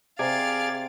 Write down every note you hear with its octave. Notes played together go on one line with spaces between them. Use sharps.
C3 G#4 D5 F5 A6